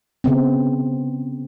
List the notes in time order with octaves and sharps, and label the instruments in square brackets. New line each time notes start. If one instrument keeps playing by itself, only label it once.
[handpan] C#3 B3 C4